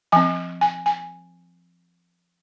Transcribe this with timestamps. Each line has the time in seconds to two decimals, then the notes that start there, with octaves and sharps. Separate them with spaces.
0.12 F3 C4 G#5
0.61 G#5
0.86 G#5